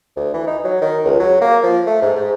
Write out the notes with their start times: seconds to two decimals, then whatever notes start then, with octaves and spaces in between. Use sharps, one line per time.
0.16 D2
0.34 E3
0.47 D#4
0.64 F#3
0.81 D#3
1.05 C#2
1.20 F#3
1.41 A#3
1.63 F3
1.87 A3
2.02 G#2
2.16 G#2